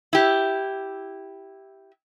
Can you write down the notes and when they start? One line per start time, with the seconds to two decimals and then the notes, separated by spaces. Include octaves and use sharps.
0.13 E4 G4